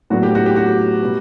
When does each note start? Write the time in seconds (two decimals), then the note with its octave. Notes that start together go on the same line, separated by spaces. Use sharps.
0.10 A2 F#3 B3 D4 F#4
0.23 G4
0.35 F#4
0.46 G4
0.56 F#4
1.02 B2 G3